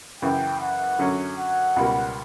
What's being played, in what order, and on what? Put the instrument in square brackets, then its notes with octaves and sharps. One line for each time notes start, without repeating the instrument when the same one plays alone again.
[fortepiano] F#2 C#3 E3 [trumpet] G5
[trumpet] F#5
[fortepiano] F#2 D3 F#3 C#4
[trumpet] F#5
[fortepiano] C#2 B2 G3 A#3